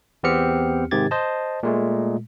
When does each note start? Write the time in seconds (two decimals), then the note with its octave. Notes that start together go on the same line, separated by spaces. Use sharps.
0.23 E2 B3 C4 G4 F6 C#7
0.91 G#2 C3 D#3 G4 G#6 A6
1.11 C5 D#5 A5
1.63 A#2 G#3 A3